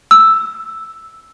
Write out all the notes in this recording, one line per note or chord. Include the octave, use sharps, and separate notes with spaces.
E6